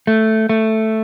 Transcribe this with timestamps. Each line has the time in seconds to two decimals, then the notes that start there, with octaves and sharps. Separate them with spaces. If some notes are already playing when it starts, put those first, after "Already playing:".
0.07 A3
0.49 A3